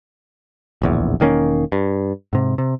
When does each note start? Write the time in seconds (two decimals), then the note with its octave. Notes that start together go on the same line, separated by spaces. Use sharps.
0.82 D1 A#1 E2
1.20 E1 D#3 A#3 C#4
1.72 G2
2.33 G#2 C3
2.58 C3